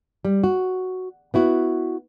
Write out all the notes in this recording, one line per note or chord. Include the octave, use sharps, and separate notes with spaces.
G3
F#4
B3 E4 F#4